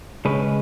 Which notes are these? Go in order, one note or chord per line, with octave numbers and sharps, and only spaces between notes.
C#3 G#3 C#4 B4